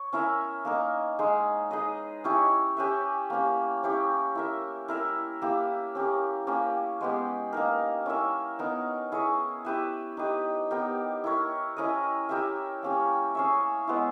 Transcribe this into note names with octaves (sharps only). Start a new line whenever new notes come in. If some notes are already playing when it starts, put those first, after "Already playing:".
Already playing: C#5
C#4 E4 A#4 E5
A#3 D#4 A#4
G#3 D#4 G#4
D#4 G#4 B4 D#5
C#4 E4 G4 C#5
C#4 G4 B4 E5
A#3 C#4 G4
C#4 E4 G4 C#5
E4 A#4 E5
E4 A#4 E5
A#3 E4 G4
C#4 G4 A#4
A#3 C#4 G4
G#3 B3 G4
A#3 D#4 A#4
C#4 E4 A#4 E5
B3 D#4 A#4
E4 G#4 C#5
E4 G4 B4 E5
D#4 G4 B4
B3 D#4 G4 A#4
E4 A#4 C#5
C#4 E4 A#4 D#5
E4 G4 A#4 E5
A#3 C#4 G4
C#4 G#4 C#5 E5
G#3 B3 E4